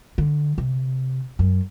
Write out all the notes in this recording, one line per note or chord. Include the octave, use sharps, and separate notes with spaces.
D3
C3
F#2